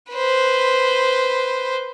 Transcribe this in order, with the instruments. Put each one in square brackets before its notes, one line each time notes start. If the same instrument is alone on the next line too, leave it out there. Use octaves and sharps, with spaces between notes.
[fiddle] B4 C5